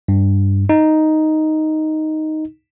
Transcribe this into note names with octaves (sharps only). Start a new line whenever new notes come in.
G2
D#4